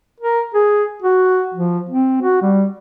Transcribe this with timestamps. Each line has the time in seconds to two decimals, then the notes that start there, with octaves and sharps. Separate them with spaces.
0.20 A#4
0.54 G#4
1.02 F#4
1.54 F3
1.89 C4
2.22 F#4
2.42 G3